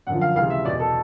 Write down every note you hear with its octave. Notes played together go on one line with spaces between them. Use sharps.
F#2 D3 F3 F#5
F5
C#2 C3 E3 F5
E5
E2 B2 D5
A4